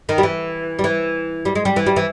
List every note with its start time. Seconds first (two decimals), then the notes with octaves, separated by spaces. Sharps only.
0.09 D#3
0.18 G3
0.23 E3
0.79 G3
0.84 E3
1.45 G3
1.55 G#3
1.65 G3
1.76 E3
1.86 G3
1.96 E3